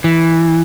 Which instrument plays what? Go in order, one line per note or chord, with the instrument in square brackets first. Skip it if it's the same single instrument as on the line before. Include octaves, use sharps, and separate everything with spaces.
[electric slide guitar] E3